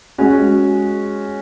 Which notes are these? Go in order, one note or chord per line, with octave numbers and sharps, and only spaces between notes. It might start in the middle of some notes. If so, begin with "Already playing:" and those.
G#3 C#4 F#4